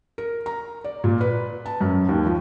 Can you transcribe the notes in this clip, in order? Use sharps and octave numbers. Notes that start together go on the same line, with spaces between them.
A#4
A#5
D5
A#2
B4
A5
F#2
D#2
F3